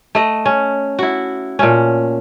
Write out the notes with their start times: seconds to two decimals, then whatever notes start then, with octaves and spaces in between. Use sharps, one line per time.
0.15 A3 D#5
0.45 C#4
0.99 E4 F#4
1.59 A#2 A3 C#4